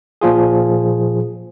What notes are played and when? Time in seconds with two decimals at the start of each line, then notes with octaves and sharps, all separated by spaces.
0.21 A#2 F3 F4 G#4